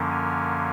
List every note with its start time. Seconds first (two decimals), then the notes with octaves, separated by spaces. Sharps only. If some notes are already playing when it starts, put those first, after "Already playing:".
Already playing: F#2 D3 F3 A#3 C#4
0.11 G#5